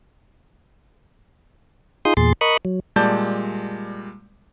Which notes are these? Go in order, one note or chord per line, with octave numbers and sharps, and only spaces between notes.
D#4 F4 G#4 C6 D#6 G6
E2 A#2 G#4 C6 A6
A#4 D#5 B5 C#6 D#6 F#6
F#3
A#2 G3 G#3 D5 A5 G6